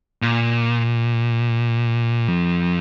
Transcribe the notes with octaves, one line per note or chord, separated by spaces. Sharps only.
A#2
F2